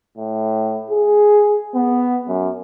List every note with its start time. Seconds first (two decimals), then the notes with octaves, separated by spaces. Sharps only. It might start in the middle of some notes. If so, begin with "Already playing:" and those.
0.18 A2
0.90 G#4
1.75 B3
2.28 F#2